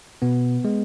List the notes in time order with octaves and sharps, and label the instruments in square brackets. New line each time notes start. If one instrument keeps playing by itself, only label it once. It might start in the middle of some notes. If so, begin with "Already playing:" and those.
[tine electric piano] B2 B3
G#3